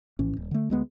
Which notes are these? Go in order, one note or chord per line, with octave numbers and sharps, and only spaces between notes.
A#1 A2 E3 C#4
D#1
D3 A3
D2 G#3 B3